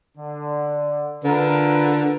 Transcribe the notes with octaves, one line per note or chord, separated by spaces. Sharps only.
D3
D3 F4 A#4 B4